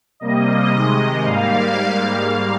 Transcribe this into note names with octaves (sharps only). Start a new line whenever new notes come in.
C3 G3 A#3 D#5
C3 D#3 G#3
G#2 G3 A#3 F5